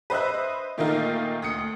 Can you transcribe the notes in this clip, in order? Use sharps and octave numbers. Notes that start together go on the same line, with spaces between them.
B4 C5 D#5 E5 F#6
A#2 D#3 A3 A#3 D#4 F4
D2 D#6 C#7